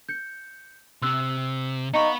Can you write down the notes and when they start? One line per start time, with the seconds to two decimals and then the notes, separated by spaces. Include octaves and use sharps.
0.09 G6 C#7
1.02 C3 C6 E6 F#6
1.94 B3 D#4 F5 B5 C#6 C#7